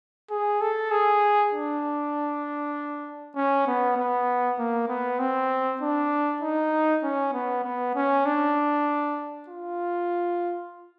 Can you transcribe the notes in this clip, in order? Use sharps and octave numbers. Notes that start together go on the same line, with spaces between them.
G#4
A4
G#4
D4
C#4
B3
B3
A#3
B3
C4
D4
D#4
C#4
B3
B3
C#4
D4
F4